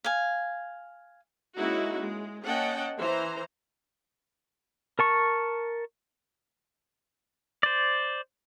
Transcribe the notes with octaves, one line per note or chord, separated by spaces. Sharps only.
F5 G#5
G#3 A#3 C#4 D#4 E4 F#4
G#3
A#3 C#4 D#5 F#5 G5 A5
E3 C5 A#5
A#4 A5 C#6
C5 D5